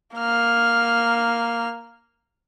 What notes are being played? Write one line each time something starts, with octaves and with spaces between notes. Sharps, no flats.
A#3 F6